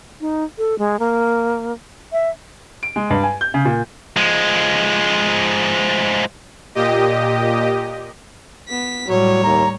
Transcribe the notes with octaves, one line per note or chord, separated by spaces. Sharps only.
D#4
A4
G#3
A#3
E5
D7
G#3
G2
G#5
G6
C#3
A#2
F3 G#3
A#2 G4 D#5
B3 B6
A2 F#3 G3 C#5
D#2 A#5